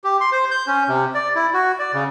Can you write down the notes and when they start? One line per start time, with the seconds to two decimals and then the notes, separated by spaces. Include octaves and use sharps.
0.04 G4
0.21 C6
0.32 C5
0.51 G6
0.67 C#4
0.88 C3
1.15 D5
1.35 E4
1.54 F#4
1.79 D5
1.93 C#3